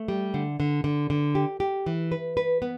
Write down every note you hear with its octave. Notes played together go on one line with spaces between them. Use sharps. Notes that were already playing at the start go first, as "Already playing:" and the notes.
Already playing: A3
G3
D3
D3
D3
D3
G4
G4
E3
B4
B4
B3